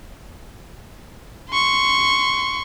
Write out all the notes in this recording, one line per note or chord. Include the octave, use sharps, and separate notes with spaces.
C6 C#6